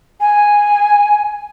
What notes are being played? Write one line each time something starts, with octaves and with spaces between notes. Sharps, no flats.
G#5